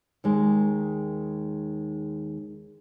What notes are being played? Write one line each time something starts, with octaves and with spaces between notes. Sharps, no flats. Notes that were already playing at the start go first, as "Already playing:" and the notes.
D#2 D#3 G#3